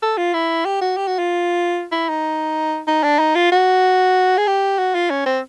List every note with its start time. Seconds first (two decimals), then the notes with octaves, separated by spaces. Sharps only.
0.02 A4
0.18 F4
0.34 E4
0.65 G4
0.81 F#4
0.97 G4
1.07 F#4
1.19 F4
1.92 E4
2.09 D#4
2.87 D#4
3.04 D4
3.19 D#4
3.35 F4
3.52 F#4
4.38 G#4
4.47 G4
4.78 F#4
4.95 F4
5.10 C#4
5.26 C4